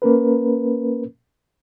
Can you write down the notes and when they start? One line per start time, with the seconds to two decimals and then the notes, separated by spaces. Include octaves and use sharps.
0.02 A#3 C#4 A#4 B4